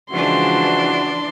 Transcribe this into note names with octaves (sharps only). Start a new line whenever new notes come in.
C#3 E3 F3 G#3 D4 F#4 C6